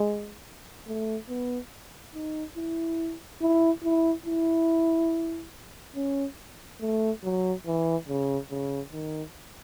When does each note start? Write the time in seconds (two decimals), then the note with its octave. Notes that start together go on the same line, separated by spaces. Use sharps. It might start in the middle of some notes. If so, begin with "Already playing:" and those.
Already playing: G#3
0.88 A3
1.29 B3
2.15 D#4
2.57 E4
3.42 E4
3.84 E4
4.26 E4
5.96 C#4
6.81 A3
7.24 F#3
7.67 E3
8.09 C#3
8.51 C#3
8.93 D#3